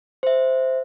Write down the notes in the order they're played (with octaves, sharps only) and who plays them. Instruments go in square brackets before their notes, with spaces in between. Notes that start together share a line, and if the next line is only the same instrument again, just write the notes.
[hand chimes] C5 E5